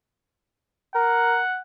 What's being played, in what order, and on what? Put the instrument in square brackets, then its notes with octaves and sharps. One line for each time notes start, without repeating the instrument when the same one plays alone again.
[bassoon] A#4 [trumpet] F#5